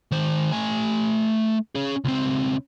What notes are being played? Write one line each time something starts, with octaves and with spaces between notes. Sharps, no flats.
D#3 C5
A3 G#5
C#4 G#4
C#2 C4